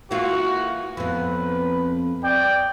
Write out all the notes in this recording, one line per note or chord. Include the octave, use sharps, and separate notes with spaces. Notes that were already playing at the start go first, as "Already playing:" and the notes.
E3 A#3 F4 F#4
F2 B3 B4
D5 G5